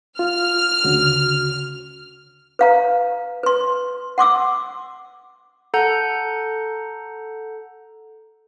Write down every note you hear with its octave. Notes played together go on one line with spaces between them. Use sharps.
F4 F6
D2 C#3 F#4
B4 F5 A#5
B4 C6
F#5 C6 D6 E6
A4 F#5 A#5 G6